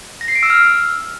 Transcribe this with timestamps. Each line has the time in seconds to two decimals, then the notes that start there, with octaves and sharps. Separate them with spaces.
0.21 A#6
0.28 C7
0.35 D7
0.43 E6
0.50 F6